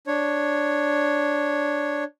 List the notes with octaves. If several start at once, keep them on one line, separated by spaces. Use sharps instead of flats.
D4 C#5